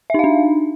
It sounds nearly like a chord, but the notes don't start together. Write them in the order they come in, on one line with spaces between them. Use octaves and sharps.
E5 D#4 F5 D4